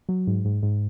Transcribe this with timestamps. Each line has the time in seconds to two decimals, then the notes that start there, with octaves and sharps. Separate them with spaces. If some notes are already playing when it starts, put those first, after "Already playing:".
0.09 F#3
0.27 G#2
0.45 G#2
0.63 G#2